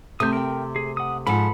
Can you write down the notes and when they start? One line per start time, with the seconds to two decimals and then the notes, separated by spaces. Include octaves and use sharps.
0.20 C3 A3 D#6 G6
0.33 A#4 G5
0.76 G#4
0.97 F#5 D#6
1.27 G#2 F3 A4 B5